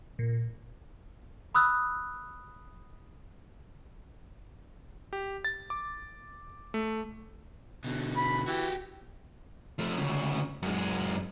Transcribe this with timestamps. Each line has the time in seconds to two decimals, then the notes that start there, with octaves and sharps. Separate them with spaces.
0.19 A#2
1.55 B5 D#6 E6 F#6
5.13 G4
5.45 A6
5.70 D6
6.74 A3
7.84 B2 D3
8.17 B5
8.46 E3 F#4 G4
9.79 F3 A3
9.97 D2 C#3
10.62 F#2 G#3